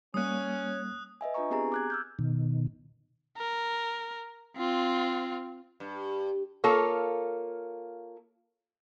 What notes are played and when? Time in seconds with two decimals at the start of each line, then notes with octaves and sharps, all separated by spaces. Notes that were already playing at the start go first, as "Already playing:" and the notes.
0.14 G3 A#3 C#4 C#5 D#6 F#6
1.21 B4 D#5 E5 G#5
1.34 D4 F4 B4 G#5 A#5 C#6
1.50 B3 C4 G4 G#4 G#5 A#5
1.72 D6 F#6 G#6
1.90 E6 F6 G6
2.19 B2 D#3
3.37 A#4
4.57 C4 F4
5.80 G2
6.64 A#3 F4 A4 C#5